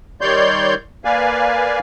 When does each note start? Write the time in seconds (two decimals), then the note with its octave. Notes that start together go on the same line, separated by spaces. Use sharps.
0.21 D#3 G3 C#5 D5 C6 G6
1.05 A#3 B4 D5 F5 G#5